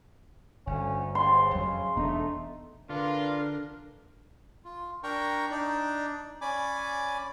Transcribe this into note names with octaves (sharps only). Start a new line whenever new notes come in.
G1 D2 A3 C#4
D#2 G#2 C6
F2 C#3 F#3
E1 A3 B3 D4 D#4
D3 D4 F4 A#4 B4 D5 F5
F4
D4 A#4 G5 A#5 C#6
D4 D#4 D5
C#4 D5 G#5 B5 D6